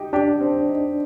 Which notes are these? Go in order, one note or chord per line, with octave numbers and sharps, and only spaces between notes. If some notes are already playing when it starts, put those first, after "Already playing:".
Already playing: D#4 G4
D4 G4
C4
D#4